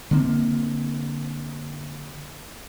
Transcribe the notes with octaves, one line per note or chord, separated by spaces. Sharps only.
D3 A#3 C4